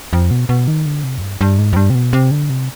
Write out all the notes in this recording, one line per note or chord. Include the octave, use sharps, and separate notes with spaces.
F2
B2
B2
D#3
D3
C3
F2
G2
G2
G#2
F2
G2
C3
B2
C3
D3
C3